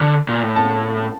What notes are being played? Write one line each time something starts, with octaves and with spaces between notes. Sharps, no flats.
D3
A#2
A2
A5